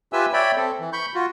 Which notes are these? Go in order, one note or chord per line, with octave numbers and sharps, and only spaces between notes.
F4 G4 B4 E5 G#5 E6
C#5 D5 E5 G5 B5
C4 A4
E3
B5 C#6 G6
F4 F#4